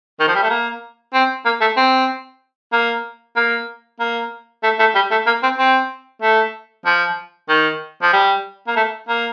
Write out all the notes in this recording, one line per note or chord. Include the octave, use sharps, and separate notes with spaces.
D#3
F3
G3
A3
A#3
C4
A#3
A3
C4
A#3
A#3
A#3
A3
A3
G3
A3
A#3
C4
C4
A3
F3
D#3
F3
G3
A#3
A3
A#3